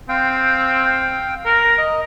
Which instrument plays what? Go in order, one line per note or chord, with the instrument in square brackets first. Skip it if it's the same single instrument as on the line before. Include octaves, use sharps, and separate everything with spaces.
[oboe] C4 [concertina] F5 G5
[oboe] A#4
[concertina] D#5